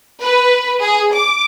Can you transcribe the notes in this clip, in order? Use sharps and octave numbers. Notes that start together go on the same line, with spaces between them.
B4
G#4
D6